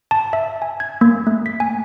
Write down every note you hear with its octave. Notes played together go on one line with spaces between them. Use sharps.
A5
E5
G#5
G#6
A#3
A3
B6
G#5